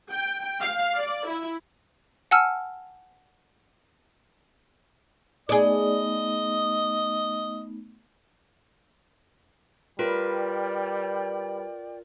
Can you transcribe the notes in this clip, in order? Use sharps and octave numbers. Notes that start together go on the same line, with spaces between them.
G5
F5
D5
E4
F#5 G#5 A5 E6 F6
A3 B3 D#4 G#4 D5 D#5
G3 F4 A#4 B4 D5 G5